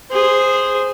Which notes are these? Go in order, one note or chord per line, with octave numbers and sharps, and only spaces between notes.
G#4 C5